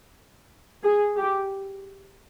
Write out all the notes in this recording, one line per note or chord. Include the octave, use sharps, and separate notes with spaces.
G#4
G4